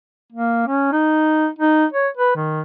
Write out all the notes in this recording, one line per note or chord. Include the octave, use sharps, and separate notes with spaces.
A#3
C#4
D#4
D#4
C#5
B4
D#3